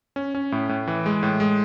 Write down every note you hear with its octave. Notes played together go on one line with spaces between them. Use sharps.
C#4
C#4
A2
A2
E3
G#3
A2
G#3